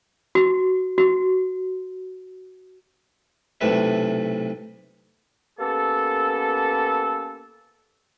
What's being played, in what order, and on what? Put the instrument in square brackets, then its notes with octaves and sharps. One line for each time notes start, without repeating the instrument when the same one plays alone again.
[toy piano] F#4
F#4
[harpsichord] B1 A2 C3 A3 B4 E5
[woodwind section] A#3 B3 C#4 G4 A4